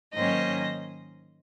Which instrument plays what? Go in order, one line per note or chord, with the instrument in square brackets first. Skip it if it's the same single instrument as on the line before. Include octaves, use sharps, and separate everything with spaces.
[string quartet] G#2 D#3 F#3 A#3 C#4 C5 D#5